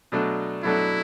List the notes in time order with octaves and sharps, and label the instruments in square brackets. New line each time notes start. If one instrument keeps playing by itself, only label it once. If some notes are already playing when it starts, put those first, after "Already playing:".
[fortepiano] B2 F#3 A3 D4 A4
[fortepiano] B2 F#3 A3 D4 A4 [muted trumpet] E4